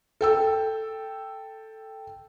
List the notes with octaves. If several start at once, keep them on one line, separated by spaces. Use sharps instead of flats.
A4 G5 E6